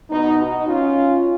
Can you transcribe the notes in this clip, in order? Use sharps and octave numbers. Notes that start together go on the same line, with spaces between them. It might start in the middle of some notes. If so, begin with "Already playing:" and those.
B2 B3 D#4
D#4 F#4
C#4 F4